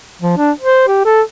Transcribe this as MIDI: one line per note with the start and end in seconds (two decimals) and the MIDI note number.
0.22 0.37 53
0.37 0.51 62
0.60 0.88 72
0.88 1.01 67
1.05 1.21 69